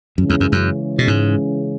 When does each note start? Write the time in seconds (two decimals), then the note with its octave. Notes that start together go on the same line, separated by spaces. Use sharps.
0.18 F#2 C#3 E3 G#3 C#4
0.30 E2
0.40 F#2
0.52 F#2
0.98 B2
1.08 G#2